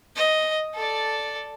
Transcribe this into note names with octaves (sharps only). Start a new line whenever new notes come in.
D#5
A4 D5